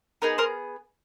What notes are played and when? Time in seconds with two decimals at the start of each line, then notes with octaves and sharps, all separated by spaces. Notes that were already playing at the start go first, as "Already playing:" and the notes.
0.22 B3 D#4 G#4 A#4
0.38 A#4 C5